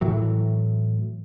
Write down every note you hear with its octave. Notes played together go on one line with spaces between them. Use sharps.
A2 E3 F#3